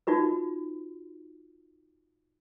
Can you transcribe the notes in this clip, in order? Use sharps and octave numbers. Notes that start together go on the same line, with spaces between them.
D#4 F4 F#4 B4